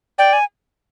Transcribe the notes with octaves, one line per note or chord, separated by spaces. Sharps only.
D5 G5
G#5